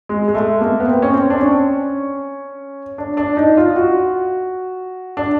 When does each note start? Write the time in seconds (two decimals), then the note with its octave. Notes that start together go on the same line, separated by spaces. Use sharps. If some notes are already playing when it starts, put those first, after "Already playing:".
0.09 G#3
0.28 G#3
0.35 A3
0.61 A#3
0.80 B3
0.88 C4
1.02 C#4
1.14 C4
1.30 D4
1.40 C#4
2.98 D4
3.17 D4
3.37 D#4
3.57 F4
3.76 F#4
5.17 D4